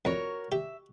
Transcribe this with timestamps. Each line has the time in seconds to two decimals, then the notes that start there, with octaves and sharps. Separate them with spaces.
0.05 F2 F#4 A#4 C#5
0.52 G4 E5